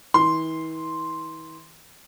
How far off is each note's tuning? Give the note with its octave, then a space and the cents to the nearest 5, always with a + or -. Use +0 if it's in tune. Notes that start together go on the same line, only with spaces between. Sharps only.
E3 -40 C6 +0